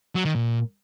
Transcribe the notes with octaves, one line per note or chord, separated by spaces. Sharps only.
F#3
D#3
A#2